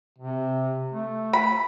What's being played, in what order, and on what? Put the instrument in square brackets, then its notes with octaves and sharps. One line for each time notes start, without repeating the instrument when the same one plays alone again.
[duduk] C3
A3
[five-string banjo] B5